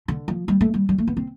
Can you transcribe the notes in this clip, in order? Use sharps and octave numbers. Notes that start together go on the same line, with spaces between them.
D3
F3
G3
A3
G3
G3
A3
B3
C4